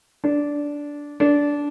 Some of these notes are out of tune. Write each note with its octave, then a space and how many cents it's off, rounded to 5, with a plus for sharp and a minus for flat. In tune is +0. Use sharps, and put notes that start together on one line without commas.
D4 -10
D4 -15